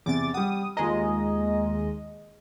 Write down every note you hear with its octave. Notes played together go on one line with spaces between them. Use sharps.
E2 C3 D6 A6
G3 F#5 D#6
D#2 G#3 F4 D#5 G#5 A#5